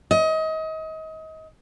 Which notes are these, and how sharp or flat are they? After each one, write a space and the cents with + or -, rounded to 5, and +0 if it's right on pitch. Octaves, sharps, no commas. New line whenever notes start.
D#5 +30